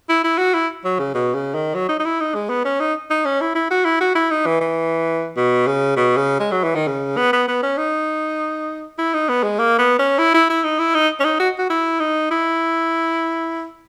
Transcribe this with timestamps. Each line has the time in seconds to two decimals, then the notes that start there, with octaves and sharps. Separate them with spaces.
0.09 E4
0.24 E4
0.38 F#4
0.54 E4
0.85 F#3
0.99 C#3
1.15 B2
1.35 C#3
1.54 D#3
1.75 F#3
1.89 D#4
2.00 D#4
2.05 E4
2.20 D#4
2.35 G#3
2.49 B3
2.65 C#4
2.80 D#4
3.10 D#4
3.25 C#4
3.41 E4
3.55 E4
3.71 F#4
3.85 E4
4.01 F#4
4.15 E4
4.31 D#4
4.46 E3
4.61 E3
5.37 B2
5.67 C#3
5.97 B2
6.17 C#3
6.40 G#3
6.52 F#3
6.63 E3
6.75 D#3
6.87 C#3
7.17 B3
7.33 B3
7.48 B3
7.63 C#4
7.78 D#4
8.98 E4
9.14 D#4
9.29 B3
9.43 G#3
9.59 A#3
9.79 B3
9.99 C#4
10.18 E4
10.34 E4
10.50 E4
10.64 D#4
10.79 E4
10.95 D#4
11.20 C#4
11.25 D#4
11.40 F#4
11.58 F#4
11.70 E4
12.00 D#4
12.31 E4